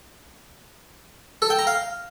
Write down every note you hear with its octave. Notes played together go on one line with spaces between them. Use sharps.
A4
G5
A#5
F5